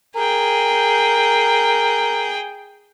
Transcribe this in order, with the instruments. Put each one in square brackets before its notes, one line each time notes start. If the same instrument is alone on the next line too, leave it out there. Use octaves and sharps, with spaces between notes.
[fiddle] G#4 G5 [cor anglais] A#4